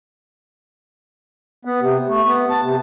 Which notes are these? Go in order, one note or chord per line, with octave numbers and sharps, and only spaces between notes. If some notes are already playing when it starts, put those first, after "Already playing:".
B3
C3
A3
B3
A5
C3